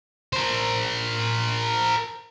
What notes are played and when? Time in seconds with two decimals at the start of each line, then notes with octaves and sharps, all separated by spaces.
0.33 A#4 C5